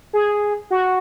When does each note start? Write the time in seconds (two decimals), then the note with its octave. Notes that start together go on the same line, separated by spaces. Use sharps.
0.13 G#4
0.70 F#4